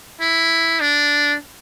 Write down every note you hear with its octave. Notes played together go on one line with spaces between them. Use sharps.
E4
D4